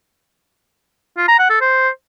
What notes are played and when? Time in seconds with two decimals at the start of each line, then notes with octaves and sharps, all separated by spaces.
1.17 F4
1.28 A#5
1.39 F#5
1.50 A4
1.61 C5